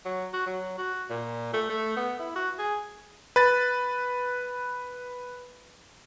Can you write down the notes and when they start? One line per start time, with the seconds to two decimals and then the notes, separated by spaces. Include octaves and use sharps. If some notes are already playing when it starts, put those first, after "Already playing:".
0.05 F#3
0.34 F#4
0.46 F#3
0.78 F#4
1.10 A#2
1.54 A3
1.70 A3
1.97 B3
2.20 E4
2.36 F#4
2.59 G#4
3.36 B4 A6